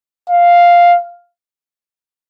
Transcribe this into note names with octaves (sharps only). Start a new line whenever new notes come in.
F5